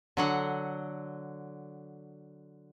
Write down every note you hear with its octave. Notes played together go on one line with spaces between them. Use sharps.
D3 F#3 F#5